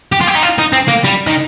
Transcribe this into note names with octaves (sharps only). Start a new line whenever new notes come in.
G4
F4
G4
D#4
F4
D#4
C4
A#3
G3
D#3